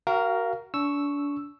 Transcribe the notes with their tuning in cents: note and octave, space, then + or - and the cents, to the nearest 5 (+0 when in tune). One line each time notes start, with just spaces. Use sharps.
F#4 +25 A#4 +0 F5 -20
D4 -35 C#6 +0 E6 +0